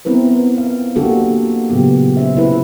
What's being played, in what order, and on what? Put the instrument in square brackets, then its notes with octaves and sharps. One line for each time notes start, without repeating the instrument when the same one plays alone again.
[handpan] B3 C4 E4 A#4 B4
F5
D3 A#3 D4 F#4 G4 A4
A#2 C#3 F#3 B3 G4
C#4 C5 E5
C3 E4 B4